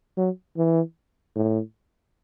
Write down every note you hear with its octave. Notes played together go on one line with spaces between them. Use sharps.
F#3
E3
A2